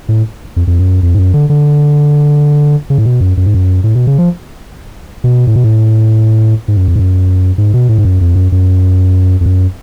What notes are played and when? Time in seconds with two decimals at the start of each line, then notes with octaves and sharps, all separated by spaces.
0.09 A2
0.56 F2
0.67 F2
0.79 F#2
1.03 F2
1.14 G#2
1.18 F#2
1.34 D3
1.50 D3
2.90 C#3
2.98 A2
3.06 B2
3.21 F#2
3.37 F#2
3.46 G#2
3.54 F#2
3.84 A2
3.95 B2
4.07 C#3
4.18 F3
5.24 B2
5.47 A2
5.56 B2
5.64 A2
6.68 G#2
6.77 F#2
6.88 F2
6.96 G#2
6.99 F#2
7.58 G#2
7.74 B2
7.89 A2
7.98 G#2
8.05 F#2
8.21 F2
8.36 F#2
8.52 F#2
9.41 F2
9.46 F#2